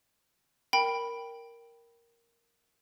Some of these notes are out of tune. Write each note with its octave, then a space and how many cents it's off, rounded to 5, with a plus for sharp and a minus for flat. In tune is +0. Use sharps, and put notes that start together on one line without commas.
A#4 +0 G5 +0 B5 +0